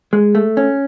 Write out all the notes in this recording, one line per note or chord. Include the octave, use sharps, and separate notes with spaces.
G#3
A3
C#4